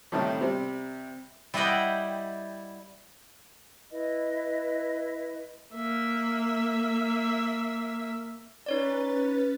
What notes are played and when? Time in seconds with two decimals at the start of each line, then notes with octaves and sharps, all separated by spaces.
0.12 A2 C3 D#3 G3 A3
0.41 C3 G3 C4
1.54 G3 E4 G4 D#5 F#5 G5
3.91 E4 B4 D#5
5.75 A#3 E5
8.66 C#4 D#4 B4 C#5 D5 A6